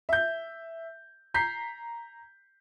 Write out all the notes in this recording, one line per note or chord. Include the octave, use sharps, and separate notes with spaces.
E5 G6
A#5 G6 B6 C7